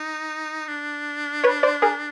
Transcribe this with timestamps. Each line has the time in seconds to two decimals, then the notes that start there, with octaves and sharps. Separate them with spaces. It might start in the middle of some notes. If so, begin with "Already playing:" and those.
Already playing: D#4
0.68 D4
1.44 B4 C#5
1.63 C5 D5
1.82 G#4 A#4